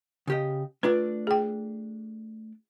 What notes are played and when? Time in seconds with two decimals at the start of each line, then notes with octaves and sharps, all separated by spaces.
0.27 C#3 G4 D#5
0.83 A3 D4 F4 B4 D5
1.27 G#4 G5